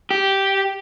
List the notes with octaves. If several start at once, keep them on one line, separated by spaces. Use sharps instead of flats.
G4